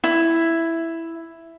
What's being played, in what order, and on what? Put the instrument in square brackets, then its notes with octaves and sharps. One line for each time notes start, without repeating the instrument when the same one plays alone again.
[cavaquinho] E4